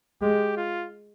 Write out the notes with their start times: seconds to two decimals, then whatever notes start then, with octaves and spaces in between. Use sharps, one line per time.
0.22 G#3 G4
0.57 F4